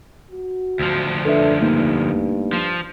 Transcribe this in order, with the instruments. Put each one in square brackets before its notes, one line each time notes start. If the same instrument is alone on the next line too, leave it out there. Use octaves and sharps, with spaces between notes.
[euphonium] F#4
[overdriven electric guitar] D2 F3
[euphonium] D4 [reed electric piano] A4 B4 E5
[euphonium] G2 [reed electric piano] A3 A#3 D#4
[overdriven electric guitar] F3